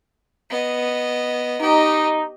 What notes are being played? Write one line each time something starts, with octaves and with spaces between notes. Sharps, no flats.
B3 D#5
D#4 G4 D#5